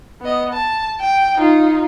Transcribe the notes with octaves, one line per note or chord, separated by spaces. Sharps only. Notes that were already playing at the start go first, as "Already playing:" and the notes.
B3 D#5
A5
G5
D#4 F4